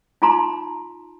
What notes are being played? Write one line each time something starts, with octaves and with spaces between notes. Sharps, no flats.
D#4 F4 A5 A#5 C6